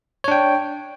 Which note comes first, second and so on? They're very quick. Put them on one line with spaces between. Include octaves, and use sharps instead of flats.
C#5 D4 G5